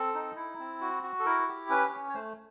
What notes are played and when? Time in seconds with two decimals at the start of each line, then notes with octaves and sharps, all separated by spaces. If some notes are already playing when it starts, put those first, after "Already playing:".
Already playing: C4 A4
0.14 D#4
0.36 E4
0.59 C4
0.81 F#4
1.03 F#4
1.20 A4
1.25 E4 A#4
1.48 G4
1.70 C#4 B4
1.92 C#4
2.09 C#5
2.14 A3 C5